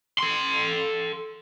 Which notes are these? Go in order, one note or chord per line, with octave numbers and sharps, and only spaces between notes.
A4 C6